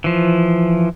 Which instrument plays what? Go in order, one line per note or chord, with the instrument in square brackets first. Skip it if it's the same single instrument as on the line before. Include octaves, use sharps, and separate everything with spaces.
[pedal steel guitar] E3 F3